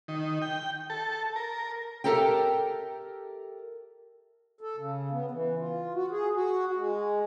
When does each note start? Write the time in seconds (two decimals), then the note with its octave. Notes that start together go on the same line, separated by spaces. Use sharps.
0.08 D#3
0.42 G5
0.90 A4
1.36 A#4
2.04 G4 A4 A#4 E5 G5
4.61 A4
4.77 C#3
5.11 B3
5.31 E3
5.59 F4
5.94 F#4
6.11 G#4
6.34 F#4
6.76 G#3